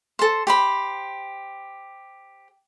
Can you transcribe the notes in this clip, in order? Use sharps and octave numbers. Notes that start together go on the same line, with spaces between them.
A4 C5
G4 C5 B5